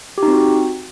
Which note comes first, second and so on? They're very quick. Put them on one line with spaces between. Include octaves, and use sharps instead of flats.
G4 D#4 C4 F#4